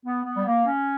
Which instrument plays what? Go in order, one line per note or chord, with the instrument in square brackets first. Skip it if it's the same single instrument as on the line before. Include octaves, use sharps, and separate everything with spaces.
[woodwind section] B3
B3
G3
A#3
C#4